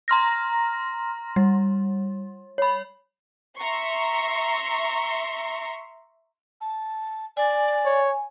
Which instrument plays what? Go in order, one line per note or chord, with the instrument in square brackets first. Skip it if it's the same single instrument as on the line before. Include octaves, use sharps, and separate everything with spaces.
[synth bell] A#5 C6 F6 A#6
G3
C#5 B5
[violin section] E5 A#5 C6 C#6
[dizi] A5
[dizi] D5 [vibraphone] G#5
[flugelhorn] C#5